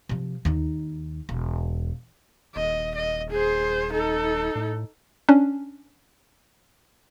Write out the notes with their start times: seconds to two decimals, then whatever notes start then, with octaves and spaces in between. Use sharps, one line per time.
0.09 C3 F3
0.45 D#2 D#4
1.29 E1
2.56 D#1 D#5
2.95 D#5
3.31 G#4 C5
3.93 D#4 A4
4.55 A2
5.29 C#4 D4